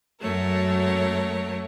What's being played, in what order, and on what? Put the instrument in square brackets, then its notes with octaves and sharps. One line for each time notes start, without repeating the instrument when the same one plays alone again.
[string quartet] F#2 F#3 A3 A#4 C#5